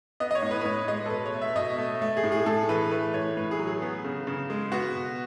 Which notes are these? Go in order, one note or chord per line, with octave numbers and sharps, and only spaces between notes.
B3 D#5
D#5
C#5
A2
B4
B4
A2 C#5
G#3 D#5
A4
B2 B4
C#5
A3
E5
B2 D#5
A3
A3
G#4
A2
G#4
A2 A4
E3 B4
A3 B4
A2 C#5
A2 B4
G#4
F#3
G#4
B3
C#3
C#3
G#3
B3 F#4
B2